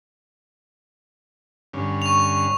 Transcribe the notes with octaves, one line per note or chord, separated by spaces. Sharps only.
G2 D3 C#4
C#6 F7